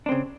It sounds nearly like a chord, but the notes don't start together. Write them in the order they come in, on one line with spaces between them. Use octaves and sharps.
D4 C4 C#3